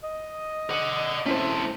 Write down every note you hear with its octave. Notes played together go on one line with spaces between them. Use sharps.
D#5
D5 F#5
A3 C4 C#4 E4 C5